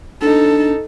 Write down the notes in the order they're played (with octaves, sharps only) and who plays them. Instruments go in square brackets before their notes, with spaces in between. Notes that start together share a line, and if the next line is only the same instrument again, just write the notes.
[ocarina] D4 [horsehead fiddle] D#4 A4